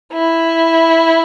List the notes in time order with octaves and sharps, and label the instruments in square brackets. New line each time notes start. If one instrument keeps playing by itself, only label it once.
[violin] E4